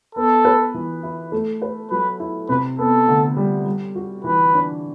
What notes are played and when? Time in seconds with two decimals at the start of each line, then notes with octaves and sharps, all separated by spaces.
0.15 B3 A4
0.45 B4
0.74 E3
1.03 E4
1.32 A3
1.62 B4
1.91 F#3 B4
2.20 E4
2.49 C3 B4
2.79 B3 A4
3.08 D2
3.37 G3
3.66 G3
3.95 F#4
4.24 E3 B4
4.54 D4